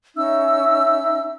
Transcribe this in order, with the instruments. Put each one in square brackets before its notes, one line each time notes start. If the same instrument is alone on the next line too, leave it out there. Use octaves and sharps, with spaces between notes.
[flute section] C#4 D#4 E5 E6